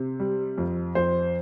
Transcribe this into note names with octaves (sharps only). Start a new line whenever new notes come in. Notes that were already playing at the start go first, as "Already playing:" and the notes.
Already playing: C3
G3
F2
F2 C5